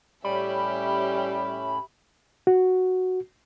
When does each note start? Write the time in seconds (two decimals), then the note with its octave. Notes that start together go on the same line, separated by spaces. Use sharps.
0.25 A2 G3 C#4 G4 E5 B5
2.47 F#4